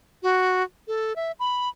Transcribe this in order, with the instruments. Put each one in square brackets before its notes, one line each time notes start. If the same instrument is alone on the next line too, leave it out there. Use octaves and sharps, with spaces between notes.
[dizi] F#4
A4
E5
B5